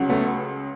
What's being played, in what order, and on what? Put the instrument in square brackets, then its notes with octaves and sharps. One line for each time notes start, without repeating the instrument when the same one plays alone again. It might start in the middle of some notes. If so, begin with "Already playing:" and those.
Already playing: [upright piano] C#2 C#3 F#3
[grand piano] A3 B3